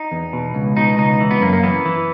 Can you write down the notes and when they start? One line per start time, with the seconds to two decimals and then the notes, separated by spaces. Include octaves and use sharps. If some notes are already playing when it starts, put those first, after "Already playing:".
Already playing: D#4
0.12 E2
0.33 B2
0.55 C#2
0.77 B2 D#4
0.98 C#2 D#4
1.20 E3
1.31 B3
1.41 F#2 A#3
1.53 A#3
1.63 E3 B3
1.86 E3